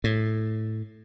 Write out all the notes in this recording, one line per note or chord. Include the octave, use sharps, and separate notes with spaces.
A2